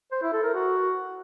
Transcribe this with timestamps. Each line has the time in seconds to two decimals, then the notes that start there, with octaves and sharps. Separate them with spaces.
0.12 C5
0.22 E4
0.33 A4
0.43 A#4
0.54 F#4